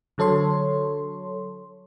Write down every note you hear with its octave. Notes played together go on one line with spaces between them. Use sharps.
D3 F#3 A4 C#5 C6